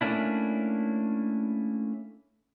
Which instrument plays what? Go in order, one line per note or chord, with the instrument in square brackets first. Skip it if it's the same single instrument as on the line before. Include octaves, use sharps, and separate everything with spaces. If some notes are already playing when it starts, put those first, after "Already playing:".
[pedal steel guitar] A3 A#3 C#4 D4 E4